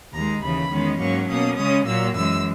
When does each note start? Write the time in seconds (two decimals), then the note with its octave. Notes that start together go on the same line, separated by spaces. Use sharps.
0.13 D#2 D#3 G#3 A#5
0.41 D#2 C#3 E3 B5
0.71 E2 D#3 G#3 C#4
0.99 G#2 F#3 A#3 C#4 C#6
1.28 B2 A#3 C#4 D#6
1.57 C#3 G#3 C#4 D#6
1.86 A#2 F#3 A#3 E6
2.15 F#2 E3 G#3 E6